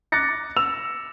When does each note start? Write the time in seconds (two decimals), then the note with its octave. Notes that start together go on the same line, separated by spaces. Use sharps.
0.12 D6 F#6 A6 A#6 C#7
0.56 E6 F7